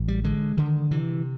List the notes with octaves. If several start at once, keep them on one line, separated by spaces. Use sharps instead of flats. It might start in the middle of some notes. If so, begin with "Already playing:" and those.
Already playing: A1
G3
D3 G#3
D3 D#3
C3 E3